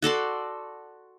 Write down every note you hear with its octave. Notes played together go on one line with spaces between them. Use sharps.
F#4 A4 D5 C6